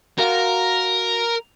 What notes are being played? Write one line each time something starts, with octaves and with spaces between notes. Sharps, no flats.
F#4 A#4 F5